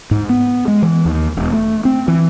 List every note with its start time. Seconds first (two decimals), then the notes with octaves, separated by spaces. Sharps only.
0.11 G#2
0.29 B3
0.68 G#3
0.82 E3
1.05 D#2
1.37 E1
1.53 A3
1.85 C4
2.08 E3